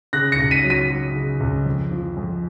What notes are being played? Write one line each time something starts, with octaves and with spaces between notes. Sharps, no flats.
C#3 F#6 A#6
A#6 C#7
C#2
B6 D#7
F#3
B6 D#7
F#3
C#3
C#2
F2
F3
F2